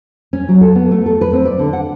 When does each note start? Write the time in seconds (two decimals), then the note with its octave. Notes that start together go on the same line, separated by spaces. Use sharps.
0.33 C#4
0.48 F#3
0.61 A4
0.75 B3
0.91 A3
1.06 A4
1.21 B4
1.33 C4
1.45 D5
1.59 D3
1.73 F#5